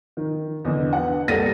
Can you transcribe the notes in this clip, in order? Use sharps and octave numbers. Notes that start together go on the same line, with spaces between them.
D#3
E2 D3 D#5
B3 F#5
C2 A#3 A4 A6 A#6 D#7